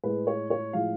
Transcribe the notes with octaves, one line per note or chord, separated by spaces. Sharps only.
A2 G#3 B4
C#5
C#5
A2 F3 G#3 F5